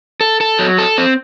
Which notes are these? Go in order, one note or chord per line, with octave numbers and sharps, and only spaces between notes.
A4
A4
F#3
A4
C4